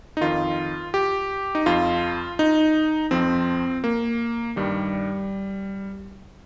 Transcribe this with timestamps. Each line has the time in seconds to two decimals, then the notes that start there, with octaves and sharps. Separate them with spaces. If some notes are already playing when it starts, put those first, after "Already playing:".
0.17 D#4
0.21 F2 D#3 F4
0.94 G4
1.55 D#4
1.66 F2 F3 F4
2.39 D#4
3.11 F2 F3 C4
3.84 A#3
4.56 G2 D#3 G3